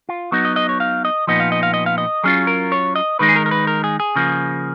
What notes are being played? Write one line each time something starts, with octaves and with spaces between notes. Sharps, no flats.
F4
F#3 B3 D#4 F#4
D#5
D#5
C#5
F5
D#5
A#2 F3 B3 D#4 D#5
F5
D#5
F5
D#5
F5
D#5
F#3 C#4 F4 G#4
A#4
C#5
D#5
D#3 G#3 D#4 B4
G#4
A#4
A#4
B4
A#4
G#4
G#4
C#3 F3 A#3